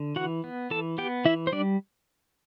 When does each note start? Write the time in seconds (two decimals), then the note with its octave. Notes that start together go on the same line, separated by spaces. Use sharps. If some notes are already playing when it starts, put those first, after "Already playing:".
Already playing: D3
0.16 E3 F#4 F#5
0.44 B3
0.70 E3 A4 A5
0.98 B3 G4 G5
1.25 E3 E4 E5
1.47 C5
1.52 G3 D4 D5